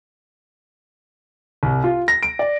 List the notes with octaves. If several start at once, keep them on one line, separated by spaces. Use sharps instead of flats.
C2
F4
A#6
D7
D5